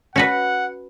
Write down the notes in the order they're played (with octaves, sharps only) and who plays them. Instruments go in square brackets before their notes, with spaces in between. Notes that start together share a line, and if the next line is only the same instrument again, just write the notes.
[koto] C#4 F#4 B4 [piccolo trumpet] F#5